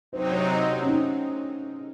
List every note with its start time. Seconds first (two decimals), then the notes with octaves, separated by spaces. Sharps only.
0.12 C3 F#3 C4 D#4 C5
0.31 C#5
0.50 D#5
0.70 C#5
0.82 C#4
0.89 D#4